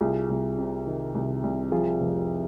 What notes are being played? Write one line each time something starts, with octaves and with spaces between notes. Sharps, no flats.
C2 F4 G#4
C2
C3
D#3
C2
C2
F3 F4 G#4
F1